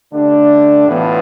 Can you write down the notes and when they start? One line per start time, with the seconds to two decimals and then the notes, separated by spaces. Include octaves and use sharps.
0.11 D3 A3 D4 G4
0.87 A2 E3 B3 F4